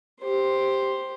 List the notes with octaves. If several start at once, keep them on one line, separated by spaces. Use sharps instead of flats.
G4 C5